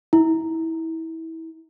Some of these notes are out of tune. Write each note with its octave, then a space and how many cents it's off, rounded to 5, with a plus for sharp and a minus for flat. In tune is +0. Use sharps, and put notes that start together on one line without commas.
E4 -25